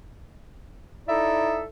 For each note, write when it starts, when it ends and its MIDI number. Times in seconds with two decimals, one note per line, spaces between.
1.08 1.64 63
1.08 1.64 64
1.08 1.64 69
1.08 1.64 74
1.08 1.64 76